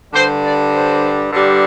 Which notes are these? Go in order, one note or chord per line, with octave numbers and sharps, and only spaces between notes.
G2 D3 G3 C5
D5
C5
G2 D3 G3